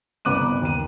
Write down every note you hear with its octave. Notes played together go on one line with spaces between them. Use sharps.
G1 C2 B3 D6 F#6 D#7
D#2 D#7